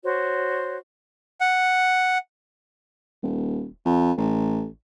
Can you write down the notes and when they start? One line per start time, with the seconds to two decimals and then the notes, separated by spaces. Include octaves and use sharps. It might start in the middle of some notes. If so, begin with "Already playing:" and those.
0.04 F#4 C5 C#5
1.41 F#5
3.23 D#1
3.85 F2
4.17 A1